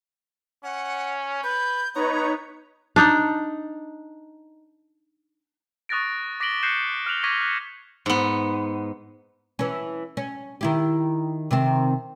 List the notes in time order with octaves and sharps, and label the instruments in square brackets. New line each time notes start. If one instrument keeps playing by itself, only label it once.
[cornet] C#4 [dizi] F#5
[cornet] B4 [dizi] G6
[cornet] B3 [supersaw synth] D#4 B4 C#5 [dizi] A#5
[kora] D4 D#4
[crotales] C#6 D#6 F#6 A6 A#6 D7
D6 A#6 B6 D7 F#7 G7
F#6 G6 C7 C#7 D#7 E7
F6 F#6 D7 F7 F#7
C#6 D6 G#6 A#6 B6 D#7
F6 F#6 C#7
[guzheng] G#2 B3
[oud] E3 C#4
C#4
D#3 E4 G4
C3 D#3 C4